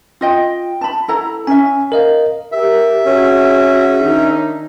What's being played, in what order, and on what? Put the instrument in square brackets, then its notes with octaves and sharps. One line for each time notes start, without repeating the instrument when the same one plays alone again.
[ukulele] F4 D#5 G5
A5 B5
E4 A4 A#5
[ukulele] C#4 E5 [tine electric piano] G#5
[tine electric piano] A#4 D#5 F5
[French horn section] G4 A#4 [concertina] E5
[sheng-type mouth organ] C#4 [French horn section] F#4 G#4
[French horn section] D#3 D4 D#4